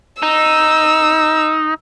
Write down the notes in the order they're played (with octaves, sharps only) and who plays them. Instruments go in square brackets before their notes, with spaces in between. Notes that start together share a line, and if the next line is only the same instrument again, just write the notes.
[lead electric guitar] D#4 [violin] E6